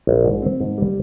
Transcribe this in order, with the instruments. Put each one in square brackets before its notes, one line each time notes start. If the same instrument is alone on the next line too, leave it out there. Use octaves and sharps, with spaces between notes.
[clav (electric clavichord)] A#1
G#2
C4
G#2
G3